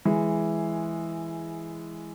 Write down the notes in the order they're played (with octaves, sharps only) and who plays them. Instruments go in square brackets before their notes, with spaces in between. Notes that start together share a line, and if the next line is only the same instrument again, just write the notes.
[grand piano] E3 G#3